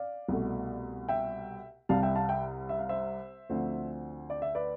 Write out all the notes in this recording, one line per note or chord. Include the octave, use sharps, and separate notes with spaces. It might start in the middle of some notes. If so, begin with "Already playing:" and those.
Already playing: D5 F5
C2 B2 A3
E5 G5
C2 C3 G3 F5 A5
E5 G5
F5 A5
E5 G5
E5
F5
C5 E5
D2 D3 F3 C4
D5
E5
B4 D5